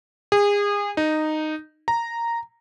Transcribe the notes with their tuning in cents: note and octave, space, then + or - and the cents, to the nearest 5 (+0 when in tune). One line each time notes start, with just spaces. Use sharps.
G#4 -30
D#4 -10
A#5 -5